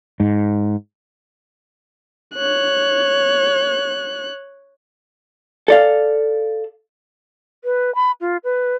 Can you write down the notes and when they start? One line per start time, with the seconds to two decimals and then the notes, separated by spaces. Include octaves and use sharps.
0.20 G#2
2.35 C#5 F#6
5.68 A4 D5 F5
7.64 B4
7.95 B5
8.21 F4
8.44 B4